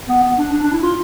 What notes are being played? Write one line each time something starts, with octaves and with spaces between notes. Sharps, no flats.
B3
B3
D4
D4
D4
E4
F4